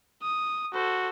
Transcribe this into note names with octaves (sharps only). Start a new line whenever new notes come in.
D#6
F#4 A4 C5